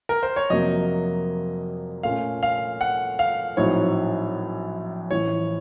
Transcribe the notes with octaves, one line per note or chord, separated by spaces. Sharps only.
A#4
C5
C#5
F2 C3 F#3 A#3 D#5
A#2 A3 C#4 F4 F5
F5
F#5
F5
A#1 A2 F#3 C4 D#4 C#5
A1 A2 F3 C#5